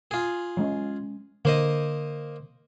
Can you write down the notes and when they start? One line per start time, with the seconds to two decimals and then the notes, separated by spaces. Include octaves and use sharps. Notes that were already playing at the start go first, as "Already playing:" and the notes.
0.11 F4 G#4
0.57 F#3 G#3 C#4
1.45 D3 A#3 C5 D#5